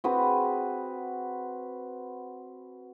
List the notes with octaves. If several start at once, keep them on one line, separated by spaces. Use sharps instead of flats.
C4 F#4 G#4 B4